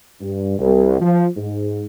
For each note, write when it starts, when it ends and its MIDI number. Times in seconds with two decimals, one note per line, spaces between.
0.21 0.58 43
0.59 0.98 36
1.01 1.26 53
1.37 1.86 44